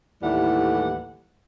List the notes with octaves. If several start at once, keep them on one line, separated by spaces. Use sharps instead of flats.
D#2 A2 E3 G3 A3 F#5